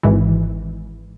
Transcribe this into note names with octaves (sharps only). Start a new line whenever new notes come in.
G#1 G#2 E3